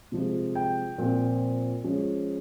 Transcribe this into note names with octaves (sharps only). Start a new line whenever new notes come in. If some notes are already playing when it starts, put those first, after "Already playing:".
C3 F3 G#3
G5
A#2 F3 C4
F3 G#3 C#4